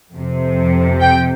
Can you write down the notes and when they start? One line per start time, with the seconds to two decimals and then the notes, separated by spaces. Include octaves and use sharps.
0.12 F2 C3
1.00 G5